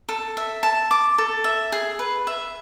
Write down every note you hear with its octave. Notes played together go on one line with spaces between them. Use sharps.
A4
E5
A5
D6
A4
E5
G#4
B4
E5